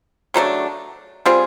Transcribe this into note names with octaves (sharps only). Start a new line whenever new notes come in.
C#3 F#3 A3 D4
G3 C4 F4 G#4